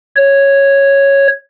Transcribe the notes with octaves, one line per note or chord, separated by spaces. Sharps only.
C#5